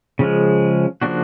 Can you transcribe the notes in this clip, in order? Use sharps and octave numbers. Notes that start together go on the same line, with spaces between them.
C#3 F3 G#3
C#3 F3 A#3 D4 F#4